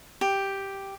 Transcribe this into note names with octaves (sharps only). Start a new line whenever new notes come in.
G4